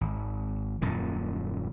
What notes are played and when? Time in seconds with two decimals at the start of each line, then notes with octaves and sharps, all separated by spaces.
0.01 G#1
0.82 D#1 F#2 A#2 D#3